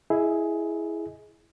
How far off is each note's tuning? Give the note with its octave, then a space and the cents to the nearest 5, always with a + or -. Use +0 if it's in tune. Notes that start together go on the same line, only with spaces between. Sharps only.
E4 +0 G#4 +10 D#5 +20